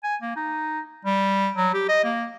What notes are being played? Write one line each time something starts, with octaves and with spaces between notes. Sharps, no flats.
G#5
A#3
D#4
G3
F#3
G4
D#5
A#3